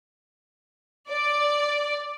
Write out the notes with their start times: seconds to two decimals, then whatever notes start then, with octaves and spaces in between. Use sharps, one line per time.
1.10 D5